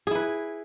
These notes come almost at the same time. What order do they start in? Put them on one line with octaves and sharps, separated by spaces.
G#4 E4 B4